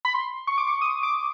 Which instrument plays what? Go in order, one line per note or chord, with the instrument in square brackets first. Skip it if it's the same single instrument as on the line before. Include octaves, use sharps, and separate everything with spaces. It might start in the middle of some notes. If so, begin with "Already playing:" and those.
[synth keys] B5
C6
C#6
D6
C#6
D#6
D6